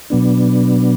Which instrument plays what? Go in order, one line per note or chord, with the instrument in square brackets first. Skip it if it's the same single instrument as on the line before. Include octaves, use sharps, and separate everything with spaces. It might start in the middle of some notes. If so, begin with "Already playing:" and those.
[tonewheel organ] B2 F#3 B3 D4